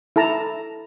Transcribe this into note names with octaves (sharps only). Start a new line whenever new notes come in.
E4 A4 A5 A#5